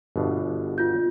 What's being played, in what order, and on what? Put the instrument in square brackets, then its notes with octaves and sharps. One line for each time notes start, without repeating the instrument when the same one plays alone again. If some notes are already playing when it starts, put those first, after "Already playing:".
[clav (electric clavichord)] G1 B2 D4
[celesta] F4 G6